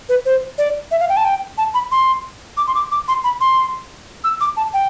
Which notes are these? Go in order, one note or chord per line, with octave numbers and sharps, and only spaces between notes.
B4
C5
D5
E5
F5
G5
A5
G5
A5
B5
C6
D6
C6
D6
D6
C6
B5
C6
E6
D6
A5
G5